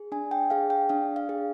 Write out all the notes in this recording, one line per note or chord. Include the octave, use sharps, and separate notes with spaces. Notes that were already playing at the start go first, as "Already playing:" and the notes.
Already playing: G#4
D4 G#5
G5
G#4 F5
G5
D4 F5
F5
G#4